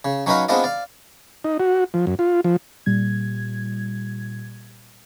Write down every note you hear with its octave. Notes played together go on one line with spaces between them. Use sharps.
C#3
F#3 C#4 D#4 B4 D#5 F5
G#3 B3 C4 D4 F4 D#5
D5 F5
D#4
F#4
F3
F#2
F4
F3
A#2 G3 G#6